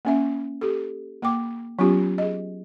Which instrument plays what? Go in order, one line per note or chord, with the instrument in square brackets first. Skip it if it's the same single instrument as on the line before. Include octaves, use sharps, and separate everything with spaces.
[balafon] A#3 C#4 E5
G4 A4
A#3 G5 D6
F#3 B3 C#4 F4 G4
G#4 D#5